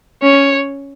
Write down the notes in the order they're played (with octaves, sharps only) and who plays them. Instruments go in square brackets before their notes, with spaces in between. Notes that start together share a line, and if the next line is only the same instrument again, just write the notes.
[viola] C#4 [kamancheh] C#5